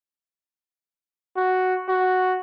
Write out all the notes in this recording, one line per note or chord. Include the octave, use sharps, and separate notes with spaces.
F#4
F#4